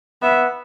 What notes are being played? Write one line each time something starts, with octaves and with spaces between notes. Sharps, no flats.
B3 E5